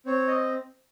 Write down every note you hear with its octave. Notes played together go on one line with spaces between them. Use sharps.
C4 C#5
D#5